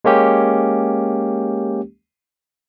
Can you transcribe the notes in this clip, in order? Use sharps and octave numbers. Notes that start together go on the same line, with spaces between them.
G#3 A#3 C#4 G4